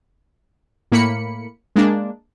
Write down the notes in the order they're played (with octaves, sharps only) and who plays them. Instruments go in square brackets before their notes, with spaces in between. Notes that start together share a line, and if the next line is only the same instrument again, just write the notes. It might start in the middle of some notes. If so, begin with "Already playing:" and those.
[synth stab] A2 A#3 B5 C#7
G#3 A#3 D4